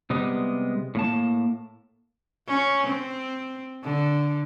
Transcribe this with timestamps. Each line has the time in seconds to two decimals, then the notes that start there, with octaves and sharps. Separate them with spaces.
0.10 C3 G3 G#3 B3
0.95 A2 A#3 A5
2.48 C#4
2.87 C4
3.84 D3